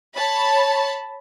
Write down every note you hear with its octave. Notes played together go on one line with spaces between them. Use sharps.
C#5 A5 B5